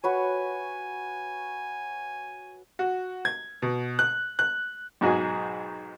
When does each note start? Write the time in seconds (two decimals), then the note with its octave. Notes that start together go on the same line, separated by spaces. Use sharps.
0.04 F#4 B4 C#5 G#5
2.79 F#4
3.25 G#6
3.62 B2
3.99 F#6
4.39 F#6
5.01 B1 G#2 F#4 G#4 G#5